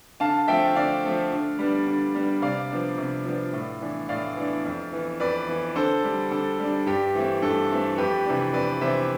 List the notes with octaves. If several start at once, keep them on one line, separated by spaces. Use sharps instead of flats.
D3 F5 A5
F3 A3 C4 E5 G5
D3 D5 F5
F3 A3 C4
D3
G3 B3 D4
D3
G3 B3 D4
C3 D5 F5
F3 B3 D4
C3
F3 B3 D4
A2
E3 B3 D4
A2 D5 F5
E3 B3 D4
F2
E3 B3
F2 B4 D5
E3 B3
D3 A4 C5
G3 D4
D3 A4
G3 D4
G2 G4
E3 A3 C4
G2 A4
E3 A3 C4
F2 G4 B4
C3 E3 B3 D4
F2 B4 D5
C3 E3 B3 D4 C5 E5